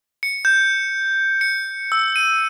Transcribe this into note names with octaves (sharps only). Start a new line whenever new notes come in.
C#7
G6
C#7
E6
D#7